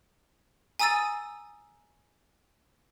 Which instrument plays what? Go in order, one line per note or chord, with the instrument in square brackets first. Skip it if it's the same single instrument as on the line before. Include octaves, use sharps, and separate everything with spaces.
[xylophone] G#5 A#5 D#6 E6 A6 D#7